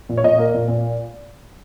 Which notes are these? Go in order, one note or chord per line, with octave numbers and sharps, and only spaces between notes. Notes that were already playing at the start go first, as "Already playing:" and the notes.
A#2
C#5
A#2 D#5
A#3
A#2
A#2